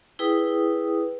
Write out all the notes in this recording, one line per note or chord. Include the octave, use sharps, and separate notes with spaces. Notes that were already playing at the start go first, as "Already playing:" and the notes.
E4 G#4 B4 G5 D#6